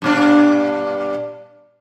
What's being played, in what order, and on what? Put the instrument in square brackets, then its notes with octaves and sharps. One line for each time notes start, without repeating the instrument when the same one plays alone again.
[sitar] G2 A#2 D4